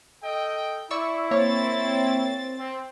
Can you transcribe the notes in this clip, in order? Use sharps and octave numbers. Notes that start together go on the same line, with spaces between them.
A4 D#5 G5
E4 D5 C#6 E6
A#3 C4 C#5 A6
C4